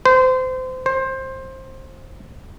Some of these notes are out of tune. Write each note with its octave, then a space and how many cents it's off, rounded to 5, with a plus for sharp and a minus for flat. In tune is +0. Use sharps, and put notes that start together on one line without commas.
C5 -25
C5 +20